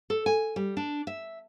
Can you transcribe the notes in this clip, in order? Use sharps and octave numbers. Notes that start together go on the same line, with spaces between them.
A4
G#5
G3
D4
E5